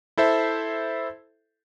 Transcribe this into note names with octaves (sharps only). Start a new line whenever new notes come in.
E4 A4 C5 E5